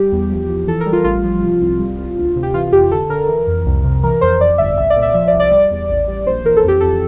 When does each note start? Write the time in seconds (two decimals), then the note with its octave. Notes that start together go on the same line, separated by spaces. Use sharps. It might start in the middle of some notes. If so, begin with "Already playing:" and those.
Already playing: G3 G4
0.12 E2
0.31 F3
0.49 F3
0.67 E3 A4
0.81 A#4
0.86 G3
0.93 F4
1.04 A1 F4
1.24 F3
1.42 C3
1.61 C2
1.79 G3
1.99 C2
2.17 D2
2.36 C3
2.43 G4
2.54 E3 F4
2.67 F4
2.72 F2 G4
2.91 D3 A4
3.09 D3 A#4
3.28 E3
3.47 F2
3.66 C2
3.84 C3
4.04 E3 A#4
4.21 F2 C5
4.40 F2 D5
4.58 G1 E5
4.78 C2 E5
4.90 D5
4.96 A#2
5.02 E5
5.14 F3 E5
5.28 D5
5.33 C2
5.40 D5
5.51 G3 D5
5.70 E2
5.90 A1
6.07 G3
6.26 A#1 C5
6.44 E3 A#4
6.56 A4
6.64 F2 G4
6.81 F2 A4